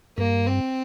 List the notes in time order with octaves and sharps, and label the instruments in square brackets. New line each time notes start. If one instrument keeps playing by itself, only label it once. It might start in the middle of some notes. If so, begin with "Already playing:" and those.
[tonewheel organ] G2 [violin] A#3
[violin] C4